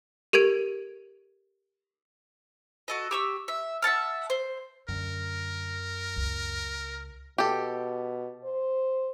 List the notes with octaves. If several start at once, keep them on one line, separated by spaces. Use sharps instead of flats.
G4 A4 A#4 G#6 D7
F#4 A4 D#5
G4 C#6 E6
E5
E5 F#5 A5 F6
C5
F#2 D3 A#4
C#2
B2 G4 A4
C5